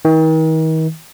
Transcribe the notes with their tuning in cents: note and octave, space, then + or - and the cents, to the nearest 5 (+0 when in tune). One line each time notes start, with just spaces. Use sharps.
D#3 +40